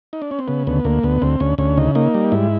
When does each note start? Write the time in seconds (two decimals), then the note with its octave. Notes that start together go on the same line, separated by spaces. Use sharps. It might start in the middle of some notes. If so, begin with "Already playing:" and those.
0.13 D#4
0.22 D4
0.31 C#4
0.39 C4
0.48 C#3 B3
0.67 D2 B3
0.85 D2 A#3
1.03 D2 B3
1.22 D2 C4
1.40 D2 C#4
1.58 D2 C#4
1.77 C#3 D#4
1.95 A#3 D#4
2.15 G3
2.32 G#2 E4